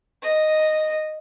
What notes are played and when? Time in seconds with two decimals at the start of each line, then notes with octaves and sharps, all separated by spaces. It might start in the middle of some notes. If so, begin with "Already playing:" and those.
0.23 D#5